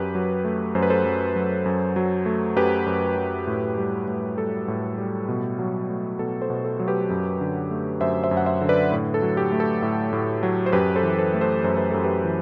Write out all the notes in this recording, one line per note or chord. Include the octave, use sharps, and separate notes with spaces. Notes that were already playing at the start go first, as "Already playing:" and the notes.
Already playing: F#2 G4 B4
F#3
A3
F#2 C5
B4
A4 C5
F#2
F#3
F#2
F#3
A3
F#2 G4 B4
F#2
F#3
A2
G3
A2
G3 A4
A2
G3
B2
F#3
A3
B2 A4
A4 C5
B2
A4
F#3
G4 B4
F#2
D3
A3
F#2 C5 E5
C5 E5
F#2
F#5
C5 E5
D3
B4 D5
A2
A4
F#3
G4
A3
A4
A2
A2
F#3
C5
F#2 G4 B4
A4 C5
E3
A4 C5
A3
A4 C5
F#2 C5
B4
F#2 A4
G4 B4
E3